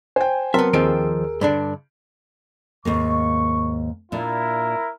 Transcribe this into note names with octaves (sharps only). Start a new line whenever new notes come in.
C5 G5 G#5
F#3 B3 C4 A#4 E5 A5 C6
D#2 D#3 F3 C4 G#4 E6 D7
G2 D3 D4
D#2 G#2 A#3 C#6
A#2 D4 E4 A#4